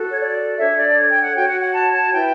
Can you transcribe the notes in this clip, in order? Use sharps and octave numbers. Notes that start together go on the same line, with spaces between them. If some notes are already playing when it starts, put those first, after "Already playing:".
Already playing: F#4 A4
C#5
D5
D4 A4 C#5 E5
D5
G5
F#5
F#4 C#5 G5
F#5
F#5
A5
A5
E4 B4 G5